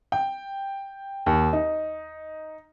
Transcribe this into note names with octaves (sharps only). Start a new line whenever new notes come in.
G5
D#2
D#4